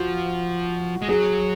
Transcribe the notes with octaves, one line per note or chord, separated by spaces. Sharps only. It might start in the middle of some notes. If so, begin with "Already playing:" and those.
Already playing: F3 F#4
G#3
F#3 G#4